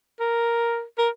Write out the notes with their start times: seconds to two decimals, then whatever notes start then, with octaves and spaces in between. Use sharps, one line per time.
0.20 A#4
0.98 A#4